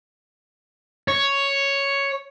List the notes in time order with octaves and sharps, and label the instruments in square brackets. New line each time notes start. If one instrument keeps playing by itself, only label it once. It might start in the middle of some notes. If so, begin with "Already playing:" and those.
[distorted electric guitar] C#5